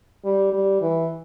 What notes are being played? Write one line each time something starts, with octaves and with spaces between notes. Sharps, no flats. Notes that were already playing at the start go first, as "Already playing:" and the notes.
G3
G3
E3